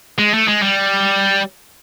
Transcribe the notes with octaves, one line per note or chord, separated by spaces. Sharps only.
G#3
A3
G#3
G3